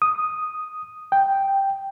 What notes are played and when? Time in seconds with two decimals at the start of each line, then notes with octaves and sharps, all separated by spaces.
0.02 D#6
1.12 G5